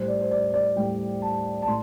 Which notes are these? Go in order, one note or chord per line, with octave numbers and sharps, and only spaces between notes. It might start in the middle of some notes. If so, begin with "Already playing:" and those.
Already playing: A2 G3 C5
D5
C5
D5
D5
A2 G3 G5
A5
A5
A2 C6